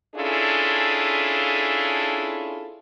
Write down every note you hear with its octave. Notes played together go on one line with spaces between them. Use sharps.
C#4 D4 E4 F4 G#4 A4